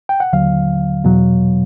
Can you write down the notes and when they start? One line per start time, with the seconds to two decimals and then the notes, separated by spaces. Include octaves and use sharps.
0.09 G5
0.20 F#5
0.33 D#2 D3 F#3 F5
1.04 E2 B2 F#3